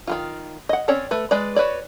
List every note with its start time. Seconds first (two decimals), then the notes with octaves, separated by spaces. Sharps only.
0.07 D#3 F3 F4
0.69 D#5 F#5
0.88 C4 C#4 C#5 D5
1.11 A3 B4
1.31 G#3 B4 D5
1.56 F#4 B4 C#5 D5